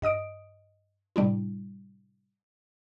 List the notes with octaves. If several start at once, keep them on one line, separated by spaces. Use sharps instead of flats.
G2 D#5 D#6 D7
A2 C3 G3 D4 E4